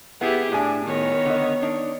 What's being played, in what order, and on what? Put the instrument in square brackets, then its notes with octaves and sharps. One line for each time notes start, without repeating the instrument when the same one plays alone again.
[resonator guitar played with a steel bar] B3 [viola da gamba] E4 G4 G#4
[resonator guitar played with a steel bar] A2 G#5 [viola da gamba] D4
[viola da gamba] D#3 B3 C#5
[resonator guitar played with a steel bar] D3 D#5
D4 D#4